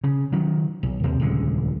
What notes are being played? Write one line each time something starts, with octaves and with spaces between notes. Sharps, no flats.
C#3
D#3 F#3
B1
D#2 C3
D#1 C#2 D3 G#3